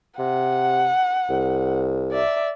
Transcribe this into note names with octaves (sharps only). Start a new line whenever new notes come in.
C3 F#5
C2
D5 E5